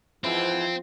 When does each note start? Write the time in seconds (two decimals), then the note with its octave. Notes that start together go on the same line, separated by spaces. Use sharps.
0.24 G#2 E3 F3 C4 E4